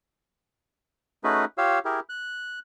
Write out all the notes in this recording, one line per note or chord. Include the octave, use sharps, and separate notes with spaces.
A3 C#4 D#4 F#4 G#4 B4
F4 G4 C#5 F5 E6
E4 G4 G#4 A#4
F#6